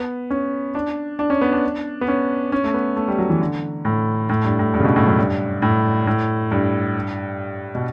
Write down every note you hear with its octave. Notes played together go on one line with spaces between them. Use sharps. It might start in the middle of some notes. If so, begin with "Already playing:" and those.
Already playing: B3
C#4
D4
D4
C#4
B3
D4
B3
C#4
C#4
A3
B3
A3
G3
F#3
E3
D3
A2
A2
G2
A2
G2
C#3
B2
A2
F#2
G2
A2
A2
G2
B2